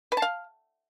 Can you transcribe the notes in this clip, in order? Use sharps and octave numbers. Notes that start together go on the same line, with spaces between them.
B4
A5
F5